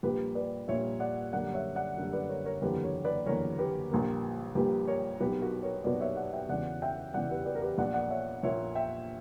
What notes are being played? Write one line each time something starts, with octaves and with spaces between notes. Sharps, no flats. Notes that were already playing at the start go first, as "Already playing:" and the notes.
A#1 A#2 G3 A#3 G4 B4
B4 D5
A#1 A#2 G3 A#3 C#5 E5
D5 F#5
F#2 D3 G3 A#3 D5 F#5
C#5 E5
D5 F#5
F#2 D3 G3 A#3
B4 D5
A#4 C#5
A#4 C#5
F#1 E2 D3 A#3 G4 B4
A#4 C#5
B4 D5
F#1 E2 D3 A#3 A#4 C#5
G4 B4
A#1 A#2 G3 A#3
A#1 A#2 G3 A#3 G4 B4
A#4 C#5
B1 B2 A#3 G4 B4
F#4 A#4
A#4 C#5
B1 B2 A#3 B4 D5
C#5 E5
D5 F#5
E5 G5
E1 E2 C#3 D5 F#5
E5 G5
E1 E2 C#3 D5 F#5
G4 B4
B4 D5
A#4
G4 B4
A#1 A#2 A#3 D5 F#5
D5 F#5
C#5 E5
A#1 A#2 A#3 C#5 E5
E5 G5